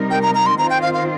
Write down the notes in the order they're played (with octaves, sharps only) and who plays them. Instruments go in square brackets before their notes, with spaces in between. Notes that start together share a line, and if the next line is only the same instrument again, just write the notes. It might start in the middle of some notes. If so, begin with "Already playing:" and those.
Already playing: [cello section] C3 G3 D#4 A#4
[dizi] G5
A#5
A#5
C6
[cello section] D#3 C4 F4 C5 [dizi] A#5
[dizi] G5
F5
F5